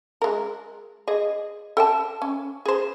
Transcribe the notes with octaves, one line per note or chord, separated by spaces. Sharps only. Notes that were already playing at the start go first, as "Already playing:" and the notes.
G#3 A#4
G#4 D#5
A4 G5 A5
C#4
G#4 C5